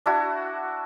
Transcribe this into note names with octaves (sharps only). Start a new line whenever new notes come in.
D4 E4 F#4